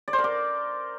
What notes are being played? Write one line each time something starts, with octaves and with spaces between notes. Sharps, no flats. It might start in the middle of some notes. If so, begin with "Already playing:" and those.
D5
C5
A#4
D6